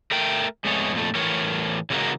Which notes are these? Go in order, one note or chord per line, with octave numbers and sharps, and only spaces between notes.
A3 A#4 G5
F2 G#3 A3 B3 C#5
F2 A#2 A3
A2 E3 A#4 C#5
C#3 E3 G#3 A#3 F#4 A#4